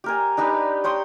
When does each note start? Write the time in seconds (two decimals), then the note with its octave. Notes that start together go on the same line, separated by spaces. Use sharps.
0.04 G4 A#4 G#5
0.37 D4 D#4 G4 B4
0.84 C#5 G5 C6 D#6